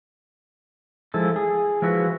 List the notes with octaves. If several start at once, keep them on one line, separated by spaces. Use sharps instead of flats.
F3 G#3 E4 A4
G#4
F3 G#3 E4 F#4 B4